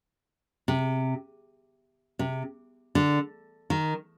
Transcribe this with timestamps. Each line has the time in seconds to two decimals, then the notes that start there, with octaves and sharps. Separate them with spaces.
0.68 C3
2.19 C3
2.95 D3
3.70 D#3